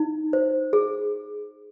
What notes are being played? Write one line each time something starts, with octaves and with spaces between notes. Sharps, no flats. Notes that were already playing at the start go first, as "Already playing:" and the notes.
Already playing: D#4
C5
G#4